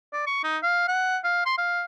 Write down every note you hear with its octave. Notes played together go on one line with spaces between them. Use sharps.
D5
C#6
D#4
F5
F#5
F5
C6
F5